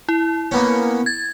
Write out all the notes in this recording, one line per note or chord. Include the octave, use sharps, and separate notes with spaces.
E4
A#3 B3 C#4
G#6 A6